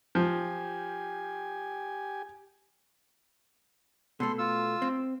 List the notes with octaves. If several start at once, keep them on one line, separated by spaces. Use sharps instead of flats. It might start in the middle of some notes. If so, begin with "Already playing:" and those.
F3 G4 G#5
B2 A3 A4 C6
F4 E6
C4